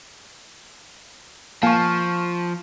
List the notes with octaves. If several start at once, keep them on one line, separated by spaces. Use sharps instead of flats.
F3 A#3 F5 G#5 A5 C#6